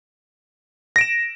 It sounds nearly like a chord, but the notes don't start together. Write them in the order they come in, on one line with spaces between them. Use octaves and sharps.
A#6 D7 E7